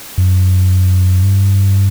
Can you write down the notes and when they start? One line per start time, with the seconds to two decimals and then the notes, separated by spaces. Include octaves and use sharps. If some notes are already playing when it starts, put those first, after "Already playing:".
0.18 F#2
1.23 G2